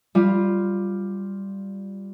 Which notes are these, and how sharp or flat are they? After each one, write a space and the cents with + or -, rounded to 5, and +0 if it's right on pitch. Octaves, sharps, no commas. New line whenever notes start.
G3 +0 F4 +0